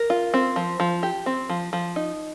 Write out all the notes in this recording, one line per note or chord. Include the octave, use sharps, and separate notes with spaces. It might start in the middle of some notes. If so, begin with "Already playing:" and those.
Already playing: A#4
F4
C4
F3
F3
G4
C4
F3
F3
D#4